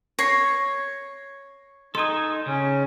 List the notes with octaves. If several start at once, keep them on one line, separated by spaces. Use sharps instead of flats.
C#5 A#6 C7
D#4 A4 G#5 C6 D#6
C#3 C#4